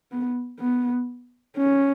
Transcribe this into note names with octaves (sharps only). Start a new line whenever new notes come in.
B3
B3
C#4